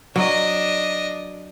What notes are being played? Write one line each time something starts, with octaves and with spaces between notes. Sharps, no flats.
F#3 D4 D#5